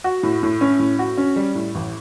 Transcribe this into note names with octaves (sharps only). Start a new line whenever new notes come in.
F#4
A2
A2
C#4
A2
F#4
C#4
G3
A2
A1